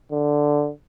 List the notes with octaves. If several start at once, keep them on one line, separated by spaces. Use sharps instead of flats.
D3